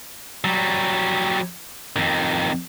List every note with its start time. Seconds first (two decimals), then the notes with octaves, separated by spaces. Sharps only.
0.44 F#3 G3
1.96 F2 D#3